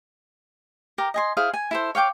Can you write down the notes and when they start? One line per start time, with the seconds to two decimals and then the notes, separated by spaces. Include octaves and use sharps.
0.98 G4 A#4
1.14 D#5 G#5 C6
1.37 E4 G#4 C5 F5
1.54 G#5
1.71 E4 A4 C5
1.95 C#5 F5 G5 D6